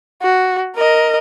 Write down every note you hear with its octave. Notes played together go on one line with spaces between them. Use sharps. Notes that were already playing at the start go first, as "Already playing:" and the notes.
F#4
A#4 D#5